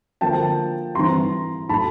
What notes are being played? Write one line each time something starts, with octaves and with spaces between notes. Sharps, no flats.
D3 F3 A#3 G5 A5
E3 G3 C4 A#5 C6
A2 F#3 A3 A5 B5